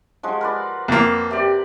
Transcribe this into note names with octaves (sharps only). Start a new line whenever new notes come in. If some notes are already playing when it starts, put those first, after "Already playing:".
F3 G#3 F#4
A#4 B4 D5
F2 A#3
C3 G4 D5